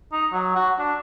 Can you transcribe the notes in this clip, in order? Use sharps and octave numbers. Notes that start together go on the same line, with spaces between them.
D#4
F#3
F#4
D4